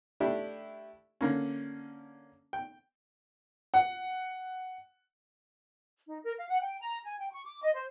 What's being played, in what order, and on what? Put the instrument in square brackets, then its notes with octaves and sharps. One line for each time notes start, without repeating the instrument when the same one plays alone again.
[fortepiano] A3 D4 E4 G4
D3 A#3 C#4
G5
[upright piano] F#5
[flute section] D#4
A#4
F5
F#5
G5
A#5
G#5
G5
C#6
D6
D#5
C5